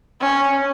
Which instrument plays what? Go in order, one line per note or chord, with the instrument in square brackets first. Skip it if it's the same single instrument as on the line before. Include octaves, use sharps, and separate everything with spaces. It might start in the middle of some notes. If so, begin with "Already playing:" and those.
[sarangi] C#4